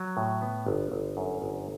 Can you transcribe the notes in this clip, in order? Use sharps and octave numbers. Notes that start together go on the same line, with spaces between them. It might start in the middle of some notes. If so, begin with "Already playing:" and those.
Already playing: F#3
A2
B3
G1
G1
F#2
G1